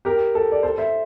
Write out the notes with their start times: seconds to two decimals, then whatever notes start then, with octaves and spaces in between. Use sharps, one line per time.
0.05 G4 A#4
0.35 A4
0.52 D5
0.63 A4 C5
0.78 C5 E5